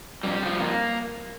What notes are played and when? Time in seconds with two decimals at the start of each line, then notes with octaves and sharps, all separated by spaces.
0.23 F2 G3
0.42 D3
0.45 F3
0.59 F2 A#3